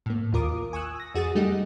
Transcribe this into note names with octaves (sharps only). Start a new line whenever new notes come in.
A2 A#3
A1 D#2 F4 A#4 D6 D#6
G#5 C#6 D#6 E6 F#6
A#6
F2 F#4 G#4 D#6 A6
G3 A3 D#4 G4 D#5 F#5